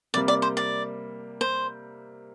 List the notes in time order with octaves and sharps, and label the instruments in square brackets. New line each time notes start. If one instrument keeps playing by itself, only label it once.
[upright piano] C3 G3 A#3 [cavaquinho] D5
[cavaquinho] D5
C5
D5
C5